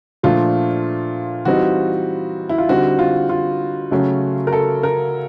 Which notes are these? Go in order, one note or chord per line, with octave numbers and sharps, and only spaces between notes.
A#2 F3 A3 D4 F4
E3 G3 C4 D#4 F#4
E4
F4
D3 G3 C4 D#4 F#4
F4
F4
C#3 F#3 A3 C#4
A#4
A4
A#4